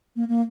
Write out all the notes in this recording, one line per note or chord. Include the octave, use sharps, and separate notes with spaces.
A#3
A#3